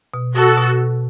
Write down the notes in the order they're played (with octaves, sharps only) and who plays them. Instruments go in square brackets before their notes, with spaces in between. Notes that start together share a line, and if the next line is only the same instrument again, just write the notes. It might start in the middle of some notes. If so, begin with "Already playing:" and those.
[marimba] B2
[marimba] B2 [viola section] F#4 A4
[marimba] B2